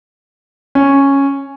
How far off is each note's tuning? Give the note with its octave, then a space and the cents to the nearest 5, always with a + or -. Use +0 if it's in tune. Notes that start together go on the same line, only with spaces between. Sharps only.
C#4 -5